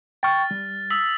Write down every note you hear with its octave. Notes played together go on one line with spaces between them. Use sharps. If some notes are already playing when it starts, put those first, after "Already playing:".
G5 C#6 F6 A6
G3
D#6 E6 B6